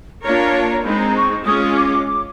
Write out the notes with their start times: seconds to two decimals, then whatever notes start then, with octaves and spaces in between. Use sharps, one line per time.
0.23 A#3 D4 F4 A#4 C#5 A#5
0.54 A5
0.69 A#5
0.84 G#3 C4 D#4 B5
0.99 A#5
1.15 C#6
1.46 G#3 C#4 F4 D#6
1.61 D#6
1.76 D6
2.07 D6